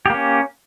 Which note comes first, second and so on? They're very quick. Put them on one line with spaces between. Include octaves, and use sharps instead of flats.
G4 A#3 C#4